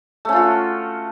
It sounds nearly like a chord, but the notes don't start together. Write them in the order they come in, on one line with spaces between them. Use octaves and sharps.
A3 C#4 F4 F#4